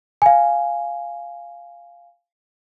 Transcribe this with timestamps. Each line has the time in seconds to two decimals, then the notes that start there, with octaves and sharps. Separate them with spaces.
0.22 F5 G#5